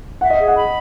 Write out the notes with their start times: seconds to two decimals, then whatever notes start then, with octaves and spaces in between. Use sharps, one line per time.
0.21 E5 F#5
0.30 D#5
0.39 G#4
0.48 F#5
0.57 B5